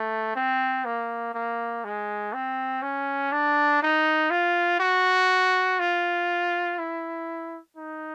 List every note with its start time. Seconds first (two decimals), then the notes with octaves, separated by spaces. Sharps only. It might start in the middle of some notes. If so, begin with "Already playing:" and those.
Already playing: A3
0.35 C4
0.85 A#3
1.34 A#3
1.84 G#3
2.34 C4
2.82 C#4
3.32 D4
3.82 D#4
4.31 F4
4.80 F#4
5.79 F4
6.79 E4
7.77 D#4